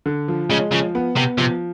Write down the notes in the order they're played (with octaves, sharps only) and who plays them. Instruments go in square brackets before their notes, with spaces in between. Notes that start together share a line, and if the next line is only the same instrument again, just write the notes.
[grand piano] D3
F3
[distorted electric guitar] C#3 [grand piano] G#3
[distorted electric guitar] C#3 [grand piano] F3
[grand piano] B3
[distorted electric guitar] C3 [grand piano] B3
[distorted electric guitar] C3 [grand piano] F3